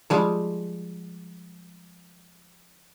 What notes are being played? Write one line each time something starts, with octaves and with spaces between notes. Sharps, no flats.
F3 G3 G#3